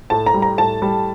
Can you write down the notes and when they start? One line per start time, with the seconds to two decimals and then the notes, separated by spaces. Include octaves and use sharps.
0.10 A2 A5
0.26 A#5
0.34 G3
0.42 A#5
0.58 A2 A5
0.82 G3